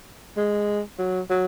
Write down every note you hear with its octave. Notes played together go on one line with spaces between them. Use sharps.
G#3
F#3
F#3